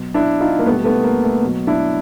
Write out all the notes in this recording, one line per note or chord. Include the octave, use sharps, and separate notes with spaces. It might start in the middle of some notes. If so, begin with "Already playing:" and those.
Already playing: B2 F#3
D4 E4
D#4 F4
A#3
B2 G3 A3 B3
A3 B3
A#3
A3
B2 F#3
D4 E4